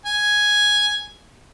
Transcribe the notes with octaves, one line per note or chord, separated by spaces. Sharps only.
G#5